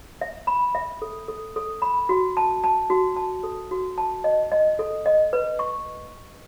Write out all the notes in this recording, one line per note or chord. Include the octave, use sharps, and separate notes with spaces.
E5
B5
E5
A4
A4
A4
B5
F#4
A5
A5
F#4
A5
A4
F#4
A5
D#5
D#5
A4
D#5
B4
C#6